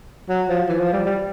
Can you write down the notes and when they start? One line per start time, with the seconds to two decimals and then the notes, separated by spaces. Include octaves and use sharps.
0.29 F#3
0.49 F3
0.68 E3
0.80 F3
0.93 G3
1.06 G3